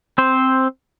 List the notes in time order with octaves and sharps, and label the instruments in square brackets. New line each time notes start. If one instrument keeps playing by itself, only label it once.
[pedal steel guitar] C4 C5